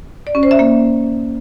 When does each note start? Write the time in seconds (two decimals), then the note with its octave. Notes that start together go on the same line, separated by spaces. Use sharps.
0.27 D5
0.35 C#4
0.43 C5
0.51 E5
0.59 A#3